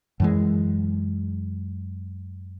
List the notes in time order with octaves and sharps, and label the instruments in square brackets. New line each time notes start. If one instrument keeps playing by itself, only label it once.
[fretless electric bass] F#2 E3 G#3